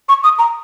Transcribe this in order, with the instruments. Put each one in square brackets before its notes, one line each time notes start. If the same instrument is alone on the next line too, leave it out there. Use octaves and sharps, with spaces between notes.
[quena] C#6
D#6
A#5